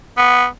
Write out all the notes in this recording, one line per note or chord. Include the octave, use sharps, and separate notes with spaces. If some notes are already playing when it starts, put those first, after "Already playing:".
B3